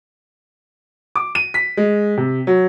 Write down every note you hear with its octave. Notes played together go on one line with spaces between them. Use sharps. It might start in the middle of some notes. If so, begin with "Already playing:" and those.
D6
D#7
B6
G#3
C3
F#3